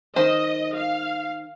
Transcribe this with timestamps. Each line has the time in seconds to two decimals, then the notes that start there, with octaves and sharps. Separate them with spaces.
0.16 D#3 C5 D#5
0.76 F5